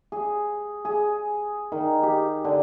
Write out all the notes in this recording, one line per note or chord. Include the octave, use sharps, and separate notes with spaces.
G#4
G#4
D#3
G4
D3